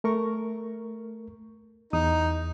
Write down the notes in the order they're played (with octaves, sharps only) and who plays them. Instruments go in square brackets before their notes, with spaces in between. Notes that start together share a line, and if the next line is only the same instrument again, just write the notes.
[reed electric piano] A3 A#4 C#6
[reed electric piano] E2 D#6 [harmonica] D#4